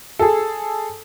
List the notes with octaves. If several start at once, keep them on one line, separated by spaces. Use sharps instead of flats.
G#4 A4